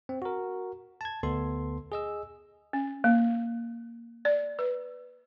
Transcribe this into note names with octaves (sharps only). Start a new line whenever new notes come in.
C4
F#4 A#4
A5 G#6
D2 B3 A4 C6
G#4 D#5 E6
C#4
A#3
D5
B4